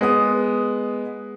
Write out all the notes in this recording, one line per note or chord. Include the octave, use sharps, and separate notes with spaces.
G#3 B3 D#6